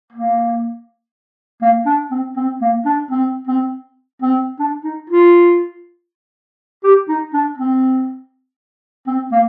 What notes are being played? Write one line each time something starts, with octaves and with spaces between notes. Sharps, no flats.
A#3
A#3
D4
C4
C4
A#3
D4
C4
C4
C4
D4
D#4
F4
G4
D#4
D4
C4
C4
A#3